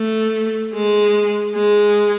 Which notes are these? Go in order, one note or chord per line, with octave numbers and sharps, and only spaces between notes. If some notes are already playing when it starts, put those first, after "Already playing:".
Already playing: A3
G#3
G#3